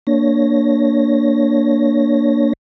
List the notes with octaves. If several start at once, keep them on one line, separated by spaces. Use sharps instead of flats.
A#3 D4 C#5 A#6